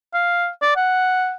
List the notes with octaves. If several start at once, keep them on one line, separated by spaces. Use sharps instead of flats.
F5
D5
F#5